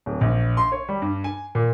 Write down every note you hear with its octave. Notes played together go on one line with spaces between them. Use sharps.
D1
A#1
C6
C#5
G3
G2
G#5
A#2